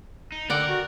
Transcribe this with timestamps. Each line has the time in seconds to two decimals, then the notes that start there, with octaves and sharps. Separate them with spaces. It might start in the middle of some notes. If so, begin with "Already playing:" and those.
0.32 D#4
0.50 D3 A#4 D5 F#5 G5
0.69 F#4